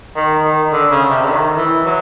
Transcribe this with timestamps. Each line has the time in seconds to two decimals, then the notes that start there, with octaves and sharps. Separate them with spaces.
0.16 D#3
0.44 D#3
0.72 D3
0.91 C#3
1.10 C3
1.24 D3
1.29 D#3
1.57 E3
1.85 F#3